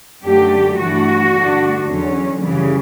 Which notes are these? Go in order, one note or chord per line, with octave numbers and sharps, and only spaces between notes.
F#2 D3 F#3 A3 G4
G2 E3 A3 D4 F#4
G2 D3 A3 D4
E2 D3 F#3 C#4
F#2 C#3 E3 G3